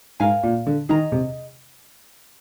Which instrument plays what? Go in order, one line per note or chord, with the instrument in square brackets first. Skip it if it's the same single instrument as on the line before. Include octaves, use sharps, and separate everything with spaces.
[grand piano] G#2 [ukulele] A#4 F5 G#5
[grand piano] A#2
D3
[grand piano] D#3 [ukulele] G#4 D#5 A#5
[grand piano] C3